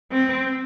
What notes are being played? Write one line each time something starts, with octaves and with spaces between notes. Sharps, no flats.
C4